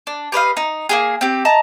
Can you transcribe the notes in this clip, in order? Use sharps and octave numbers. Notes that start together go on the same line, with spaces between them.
D4
G4 B4 D#5 F5
D#4
A#3 B3 G#4
C4 G4
D#5 A5 A#5